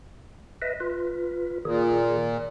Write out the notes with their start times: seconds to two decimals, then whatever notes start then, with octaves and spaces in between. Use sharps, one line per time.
0.62 B4 D#5 E5
0.80 F4 B4
1.65 A#2 D#3 G#4